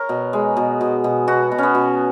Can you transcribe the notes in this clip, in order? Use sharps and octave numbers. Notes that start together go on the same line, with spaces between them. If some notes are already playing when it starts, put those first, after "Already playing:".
Already playing: A#4 C#5
B2
G#3
B2
B2
B2
B2 F#4
B2
B3 C#4
B2